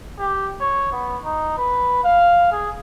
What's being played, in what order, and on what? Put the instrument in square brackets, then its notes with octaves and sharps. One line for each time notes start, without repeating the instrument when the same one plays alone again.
[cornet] G4
C#5
B3
D#4
B4
F5
G#4